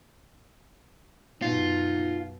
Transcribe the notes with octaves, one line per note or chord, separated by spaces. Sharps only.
F#2 B2 D#4 F4